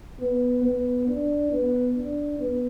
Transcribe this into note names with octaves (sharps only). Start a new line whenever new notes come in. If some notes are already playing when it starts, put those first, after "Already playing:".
B3
B3
D4
B3
D4
B3